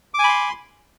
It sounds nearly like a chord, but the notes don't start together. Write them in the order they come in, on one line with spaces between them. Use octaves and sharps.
D6 G#5 B5 C6